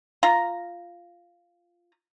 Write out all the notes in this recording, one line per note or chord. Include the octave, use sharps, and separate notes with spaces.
F4 A#5